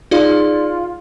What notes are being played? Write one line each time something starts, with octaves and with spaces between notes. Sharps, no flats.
D#4 F4 G#4 D5